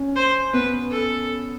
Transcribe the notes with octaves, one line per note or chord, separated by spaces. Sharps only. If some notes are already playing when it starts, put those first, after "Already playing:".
Already playing: C#4
C5
B3 B4
A4